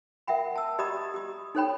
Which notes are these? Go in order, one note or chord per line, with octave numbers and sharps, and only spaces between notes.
A#4 E5 F#5 G5 B5
A5 E6
G4 D5 D#5 A#5 B5 D#6
G4 D#6
D#4 A4 C5 C#5 G5 B5